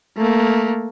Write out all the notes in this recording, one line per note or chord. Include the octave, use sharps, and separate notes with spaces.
A3 A#3